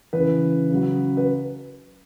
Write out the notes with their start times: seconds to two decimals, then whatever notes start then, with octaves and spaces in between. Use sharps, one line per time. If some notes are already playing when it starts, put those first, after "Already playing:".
0.13 C#3 E3 B4
0.70 C#3 F#3
1.17 B4